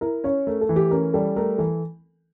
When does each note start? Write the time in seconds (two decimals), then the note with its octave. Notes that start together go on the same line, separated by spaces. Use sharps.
0.01 E4 A#4
0.24 C#4 C#5
0.47 A3 A#4
0.61 A4
0.69 E3
0.76 G4
0.91 C#4 A#4
1.14 G3 A4
1.36 A3 A#4
1.58 E3 A4